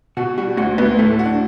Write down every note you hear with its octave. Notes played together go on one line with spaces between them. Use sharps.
B2 F#4
G3 F#4
D2 F#4
D2 B3
A2 A3
F#4
D4